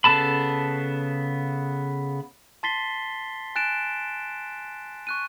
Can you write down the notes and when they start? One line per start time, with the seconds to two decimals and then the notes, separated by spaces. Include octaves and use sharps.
0.04 C#3 B3 A4 A5 B5
2.63 A5 C6 A6 B6 C7 G7
3.55 G#5 F#6 A6 D7 E7
5.07 C#6 F#6 D#7